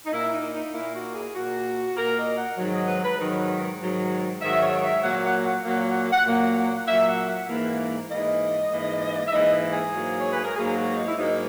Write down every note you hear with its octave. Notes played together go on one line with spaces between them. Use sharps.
D#4
A#2 A#3 E4
D#4
D#4
A#2 A#3 E4
F#4
G#4
A#2 A#3 F#4
A#2 A#3 A#4
D#5
F#5
G#2 D#3 F#3
D#5
B4
B4
G#2 D#3 F#3
G#2 D#3 F#3
G#2 D#3 F#3 E5
C#5
E5
A#2 F#3 A#3 F#5
F#5
F#5
A#2 F#3 A#3 F#5
F#5
F#5
A#2 F#3 A#3
F#5
F#5
A#2 F#3 A#3 E5
F#5
F#5
G#2 E3 A#3
G#2 E3 A#3 D#5
G#2 E3 A#3
E5
G#2 E3 A#3 D#5
G#4
G#4
G#2 F#3 A#3
C#5
B4
A#4
G#2 F#3 A#3 G#4
G#4
F#4
D#4
E4
G#2 F#3 A#3 D#4